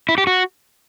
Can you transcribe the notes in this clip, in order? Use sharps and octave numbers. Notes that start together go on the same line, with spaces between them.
E4
G4
F#4